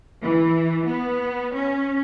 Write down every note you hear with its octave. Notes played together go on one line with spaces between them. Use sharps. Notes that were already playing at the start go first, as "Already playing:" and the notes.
E3
B3
C#4